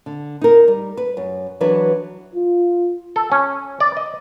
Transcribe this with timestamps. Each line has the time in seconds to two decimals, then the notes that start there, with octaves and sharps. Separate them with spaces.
0.06 D3
0.41 D#4 A#4
0.68 G3
0.97 B4
1.17 F#2
1.61 E3 F#3 D4 B4
2.35 F4
3.16 A4
3.32 C#4
3.80 D5
3.97 D#5